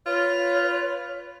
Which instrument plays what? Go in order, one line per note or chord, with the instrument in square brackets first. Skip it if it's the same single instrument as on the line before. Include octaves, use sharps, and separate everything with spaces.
[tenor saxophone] F4 [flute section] B4 C#5